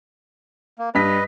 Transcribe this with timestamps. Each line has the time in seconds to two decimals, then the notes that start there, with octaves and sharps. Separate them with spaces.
0.79 A#3
0.95 G2 G3 B4 D#5 B6